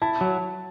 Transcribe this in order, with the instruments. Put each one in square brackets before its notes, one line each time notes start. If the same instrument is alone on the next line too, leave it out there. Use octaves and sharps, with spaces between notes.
[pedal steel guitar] E4 [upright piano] A5
[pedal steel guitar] F#3